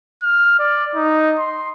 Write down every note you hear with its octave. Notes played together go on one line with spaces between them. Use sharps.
F6
D5
D#4
C6